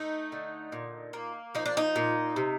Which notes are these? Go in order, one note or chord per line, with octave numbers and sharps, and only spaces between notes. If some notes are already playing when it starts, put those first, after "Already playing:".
Already playing: A3 D#4
D3
A#2
A#3
F3 D#4
D4
D#4
A#2
C3